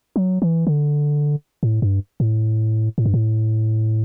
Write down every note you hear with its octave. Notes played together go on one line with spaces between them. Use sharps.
F#3
E3
D3
A2
G2
A2
A2
G2
A2